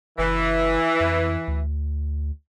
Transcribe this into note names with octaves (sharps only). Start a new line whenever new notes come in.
F#1 E3
F2
D2